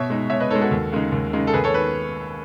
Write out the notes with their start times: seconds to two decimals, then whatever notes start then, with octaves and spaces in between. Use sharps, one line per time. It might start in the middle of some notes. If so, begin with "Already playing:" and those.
Already playing: B2 C#5 E5
0.10 G#3 D#4
0.30 B2 C#5 E5
0.40 B4 D#5
0.50 D#4 A4 C#5
0.55 G#3
0.61 F#4 A4
0.71 D#2
0.92 C#3 G#3 D#4
1.12 D#2
1.33 C#3 G#3 D#4
1.47 A4
1.53 D#2 G#4 B4
1.64 A4 C#5
1.74 D#3 B4